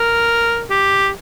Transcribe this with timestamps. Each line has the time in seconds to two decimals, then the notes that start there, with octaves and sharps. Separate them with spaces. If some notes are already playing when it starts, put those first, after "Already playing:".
Already playing: A#4
0.70 G4